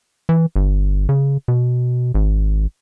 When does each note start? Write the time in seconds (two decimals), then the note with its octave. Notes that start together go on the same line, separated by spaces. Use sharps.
0.29 E3
0.56 G1
1.09 C#3
1.48 B2
2.14 G#1